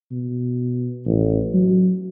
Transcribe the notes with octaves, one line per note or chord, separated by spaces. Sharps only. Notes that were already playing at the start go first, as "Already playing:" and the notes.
B2
A1
F#3